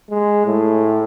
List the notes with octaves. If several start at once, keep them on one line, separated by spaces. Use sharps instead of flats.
G#3
A2